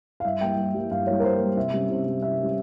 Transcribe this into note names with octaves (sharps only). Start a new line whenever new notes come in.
F5
G2 E5
G3 A#3 G5
G2
G3 A#3
G2 F5
G3 A#3 C#5
A#4
G2 C5
A#3
G3
C3 E5
G3 C#4
C3
G3 C#4
C3 E5
G3 C#4